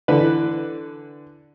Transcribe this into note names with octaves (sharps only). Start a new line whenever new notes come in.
D3 E3 D4 B4